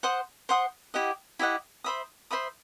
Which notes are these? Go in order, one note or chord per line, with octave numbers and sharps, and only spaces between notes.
C5 F#5 C6 D#6
C5 F#5 C6 D#6
E4 G4 D#5 F#5
E4 G4 D#5 F#5
C5 E5 B5 D#6
C5 E5 B5 D#6